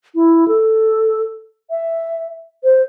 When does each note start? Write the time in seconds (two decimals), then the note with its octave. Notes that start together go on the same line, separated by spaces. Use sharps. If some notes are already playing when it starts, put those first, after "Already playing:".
0.15 E4
0.48 A4
1.70 E5
2.64 C5